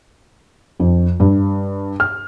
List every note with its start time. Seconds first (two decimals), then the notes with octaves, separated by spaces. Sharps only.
0.80 F2
1.20 G2
2.00 F6